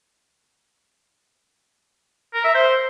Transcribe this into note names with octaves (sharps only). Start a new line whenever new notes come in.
A#4
E5
C5